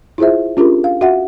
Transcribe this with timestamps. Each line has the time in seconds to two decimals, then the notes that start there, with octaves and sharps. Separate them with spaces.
0.18 E4 F4 G#4 C5 E5
0.57 C#4 D4 F4 G4 G#4 A#4
0.84 F5
1.01 F#4 E5 F#5